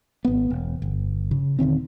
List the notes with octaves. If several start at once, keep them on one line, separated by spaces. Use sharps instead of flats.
G#1 B3
E1
G1
C#3
D#1 D3 D#3 C4